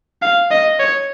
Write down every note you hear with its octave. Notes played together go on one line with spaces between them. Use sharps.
F5
D#5
C#5